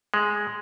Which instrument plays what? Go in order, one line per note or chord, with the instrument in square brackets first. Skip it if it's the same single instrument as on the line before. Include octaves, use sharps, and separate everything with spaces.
[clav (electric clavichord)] G#3